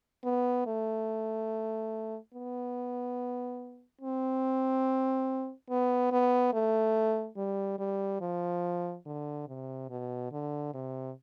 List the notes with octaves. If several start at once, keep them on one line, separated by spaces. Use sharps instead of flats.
B3
A3
B3
C4
B3
B3
A3
G3
G3
F3
D3
C3
B2
D3
C3